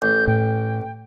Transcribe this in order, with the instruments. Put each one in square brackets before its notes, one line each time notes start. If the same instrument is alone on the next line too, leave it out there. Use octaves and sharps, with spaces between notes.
[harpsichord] A1 [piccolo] G6
[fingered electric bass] A2 [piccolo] G5